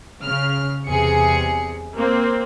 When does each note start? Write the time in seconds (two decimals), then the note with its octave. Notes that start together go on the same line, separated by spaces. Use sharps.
0.23 C#3 F6
0.87 E2 C3 G#4 C#7
1.96 A#3 C4